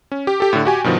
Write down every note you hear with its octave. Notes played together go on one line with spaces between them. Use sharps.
C#4
G4
G4 A4
A2 D3
F#4 G4 G#5
G2 B2 D#3 F3